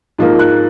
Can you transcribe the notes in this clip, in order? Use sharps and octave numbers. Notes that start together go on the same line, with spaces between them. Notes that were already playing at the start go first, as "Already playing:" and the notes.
G#2 F3 A#3
F#6